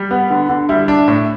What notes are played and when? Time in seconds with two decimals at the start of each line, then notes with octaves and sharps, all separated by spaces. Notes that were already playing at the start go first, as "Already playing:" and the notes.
Already playing: G3
0.11 B3
0.31 D3
0.49 D3
0.69 G3 E4
0.88 D4
1.08 A2